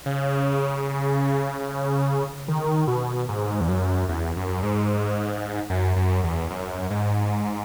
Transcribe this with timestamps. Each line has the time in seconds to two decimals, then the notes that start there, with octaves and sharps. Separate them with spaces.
0.06 C#3
2.48 D#3
2.87 B2
3.29 G#2
3.61 E2
3.69 F#2
4.09 E2
4.36 F#2
4.63 G#2
5.70 F#2
5.96 F#2
6.24 E2
6.50 F#2
6.90 G#2